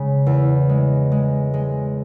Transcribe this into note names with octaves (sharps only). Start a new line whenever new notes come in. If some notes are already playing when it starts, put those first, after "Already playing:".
Already playing: C#3 G#3
E2
G#3
G#3
G#3